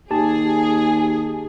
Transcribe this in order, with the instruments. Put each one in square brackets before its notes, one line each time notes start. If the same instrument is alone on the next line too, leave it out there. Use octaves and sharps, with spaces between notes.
[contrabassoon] D#2 [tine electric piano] G4 A5 [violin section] G#4